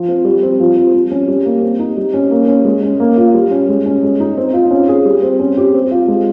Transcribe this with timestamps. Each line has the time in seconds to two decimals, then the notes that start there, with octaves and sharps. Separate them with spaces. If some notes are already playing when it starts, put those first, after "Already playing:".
Already playing: F3
0.08 C4
0.25 G3
0.42 C4
0.60 F3
0.76 C4
0.93 G3
1.11 C#4
1.28 G3
1.45 A#3
1.62 C4
1.79 D#4
1.97 G3
2.14 C#4
2.31 A#3
2.48 C#4
2.65 G#3
2.83 C#4
3.00 A#3
3.17 F4
3.34 G3
3.51 C#4
3.69 G#3
3.86 C#4
4.03 G#3
4.20 D#4
4.37 C4
4.54 F4
4.71 C#4
4.88 G#4
5.05 G3
5.22 C4
5.40 C#4
5.57 G4
5.74 C4
5.91 F4
6.08 G#3